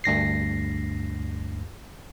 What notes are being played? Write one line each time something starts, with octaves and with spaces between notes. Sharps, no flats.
D2 G2 A#6 C7